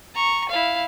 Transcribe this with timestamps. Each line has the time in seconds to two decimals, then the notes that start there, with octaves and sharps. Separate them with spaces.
0.15 A#5 C#6
0.49 E4 F5